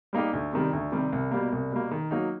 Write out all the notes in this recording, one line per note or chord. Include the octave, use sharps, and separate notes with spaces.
G3 A#3 D#4 G4
D2
C3 D#3 G3
D2
C3 D#3 G3
C2
B2 G3 A#3
C2
B2 G3 A#3
D#3
F#3 A#3 D#4